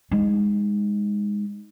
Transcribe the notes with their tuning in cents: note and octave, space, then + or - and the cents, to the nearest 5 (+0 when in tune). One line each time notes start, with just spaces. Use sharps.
G#3 -15 D#4 +10